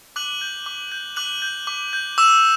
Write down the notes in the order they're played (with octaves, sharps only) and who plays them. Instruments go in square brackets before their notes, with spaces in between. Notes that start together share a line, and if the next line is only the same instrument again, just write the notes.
[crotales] D6 F#6 F#7
G6
D6
G6
D6 F#6 F#7
G6
D6
G6
D6 E6 E7